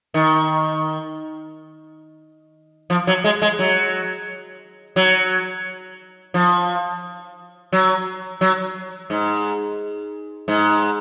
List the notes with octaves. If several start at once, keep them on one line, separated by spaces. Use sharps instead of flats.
D#3
F3
F#3
G#3
G#3
F#3
F#3
F3
F#3
F#3
G#2
G#2